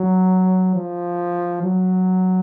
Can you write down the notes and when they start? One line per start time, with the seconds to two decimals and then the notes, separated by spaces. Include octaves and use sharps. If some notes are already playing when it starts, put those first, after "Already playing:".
Already playing: F#3
0.75 F3
1.63 F#3